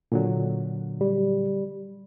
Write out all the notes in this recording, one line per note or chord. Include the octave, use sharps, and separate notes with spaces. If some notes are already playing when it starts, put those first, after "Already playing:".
A#2 D3 F#3
G3